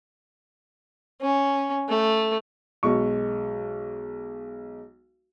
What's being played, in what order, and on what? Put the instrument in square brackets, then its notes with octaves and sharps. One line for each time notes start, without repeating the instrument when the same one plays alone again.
[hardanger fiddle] C#4
A3
[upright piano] B1 G#3 C#6